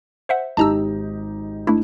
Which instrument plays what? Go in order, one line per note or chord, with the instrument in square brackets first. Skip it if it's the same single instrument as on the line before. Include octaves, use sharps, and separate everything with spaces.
[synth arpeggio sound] C5 E5 F#5
[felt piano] G#1 D#4 G4 [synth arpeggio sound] A5 A#5 E6
[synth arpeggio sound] A3 D4 E4